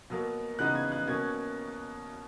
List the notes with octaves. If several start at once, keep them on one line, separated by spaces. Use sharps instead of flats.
B2 F#3 A#3
C#3 E3 B3 D#4 F#6
G#6
F#6
B2 A#3 C#4 G#6